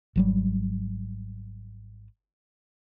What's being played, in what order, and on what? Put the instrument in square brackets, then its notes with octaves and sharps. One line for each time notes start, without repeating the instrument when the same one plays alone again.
[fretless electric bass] G#1 F#3 G3